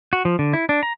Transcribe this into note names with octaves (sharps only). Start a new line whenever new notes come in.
F#4
F3
D3
E4
D4
A#5